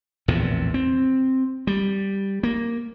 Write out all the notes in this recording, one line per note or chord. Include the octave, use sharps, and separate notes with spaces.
A#1 E2 A2 C3
C4
G3
A#3